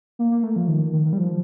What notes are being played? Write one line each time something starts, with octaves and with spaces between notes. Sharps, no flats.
A#3
A#3
A3
F3
D#3
D#3
D#3
G3
F3